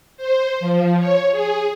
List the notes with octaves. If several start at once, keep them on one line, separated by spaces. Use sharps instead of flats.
C5
F3
C#5
G#4